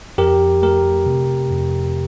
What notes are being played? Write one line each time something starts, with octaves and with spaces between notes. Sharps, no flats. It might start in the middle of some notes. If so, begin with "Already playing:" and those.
F2 G4 A#4
A3 G4 A#4
C3
F2